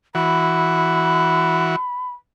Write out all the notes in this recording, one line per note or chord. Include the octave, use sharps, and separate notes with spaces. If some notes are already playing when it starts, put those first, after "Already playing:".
E3 F#4 B5